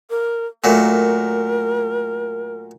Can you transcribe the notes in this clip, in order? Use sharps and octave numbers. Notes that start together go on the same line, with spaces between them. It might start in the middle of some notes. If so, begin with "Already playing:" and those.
A#4
A#2 F#3 A3 A#4